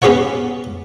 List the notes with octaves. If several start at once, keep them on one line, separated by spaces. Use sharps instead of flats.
B3 C#4 G4 G#4 C#5 F#5